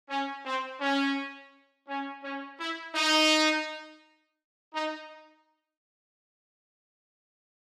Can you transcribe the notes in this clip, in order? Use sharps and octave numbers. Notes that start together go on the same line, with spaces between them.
C#4
C4
C#4
C#4
C#4
E4
D#4
D#4